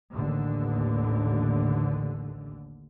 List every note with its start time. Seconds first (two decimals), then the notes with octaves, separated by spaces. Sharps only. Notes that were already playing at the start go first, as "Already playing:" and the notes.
0.13 A1 D#2 D3